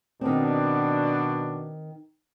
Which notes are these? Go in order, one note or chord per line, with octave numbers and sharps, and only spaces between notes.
B2 D#3 C4 D4